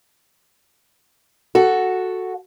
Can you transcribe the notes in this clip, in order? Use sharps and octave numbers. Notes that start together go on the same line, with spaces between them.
F#4 A4